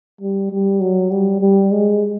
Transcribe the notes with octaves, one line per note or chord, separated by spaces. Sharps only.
G3
G3
F#3
G3
G3
G#3